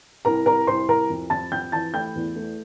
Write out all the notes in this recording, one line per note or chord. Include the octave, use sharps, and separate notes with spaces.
C2 A#4 A#5
C2 A#4 A#5
C2 C5 C6
C2 A#4 A#5
F2
F2 A5 A6
F2 G5 G6
E3 A5 A6
A3 G5 G6
E2
A3